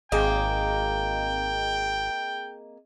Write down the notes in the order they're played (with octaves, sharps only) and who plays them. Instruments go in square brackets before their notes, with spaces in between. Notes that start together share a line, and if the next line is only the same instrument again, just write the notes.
[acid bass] G#1 [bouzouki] A#3 [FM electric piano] C4 G#4 D#5 [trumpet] G5